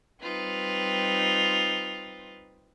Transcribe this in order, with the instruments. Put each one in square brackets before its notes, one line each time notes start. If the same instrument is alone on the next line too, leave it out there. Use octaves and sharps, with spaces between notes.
[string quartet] G3 C4 D#4 F4 B4